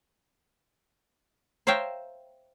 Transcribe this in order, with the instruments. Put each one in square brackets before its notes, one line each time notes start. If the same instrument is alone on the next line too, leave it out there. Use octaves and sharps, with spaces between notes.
[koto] C5 C#5 E5 F5 G5 A#5